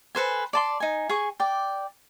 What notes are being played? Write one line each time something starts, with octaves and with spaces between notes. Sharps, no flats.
A4 B4 C5 G#5
D5 A5 C6
D#4 G#5
G#4 G#5 C#6
D5 G5